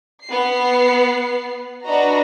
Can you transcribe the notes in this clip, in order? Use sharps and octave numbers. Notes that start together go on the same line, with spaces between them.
B3 C7
D4 F#4 B4 D#5 A#5